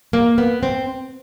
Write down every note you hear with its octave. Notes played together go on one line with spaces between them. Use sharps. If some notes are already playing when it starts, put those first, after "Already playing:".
A#3
B3
C4